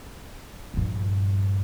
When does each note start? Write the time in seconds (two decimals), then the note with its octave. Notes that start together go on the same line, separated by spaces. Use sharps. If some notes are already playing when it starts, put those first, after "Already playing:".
0.74 A#1 G2